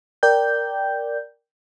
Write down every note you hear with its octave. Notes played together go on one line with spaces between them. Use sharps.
A#4 D5 G5 G6